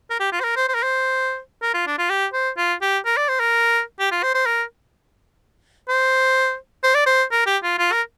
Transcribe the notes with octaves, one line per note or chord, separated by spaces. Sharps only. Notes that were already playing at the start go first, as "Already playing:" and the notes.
A#4
G4
F4
C5
A#4
C5
C5
A#4
C5
A#4
F4
D4
F4
G4
C5
F4
G4
A#4
D5
C5
A#4
G4
F4
C5
C5
A#4
C5
C5
D5
C5
A#4
G4
F4
F4
A#4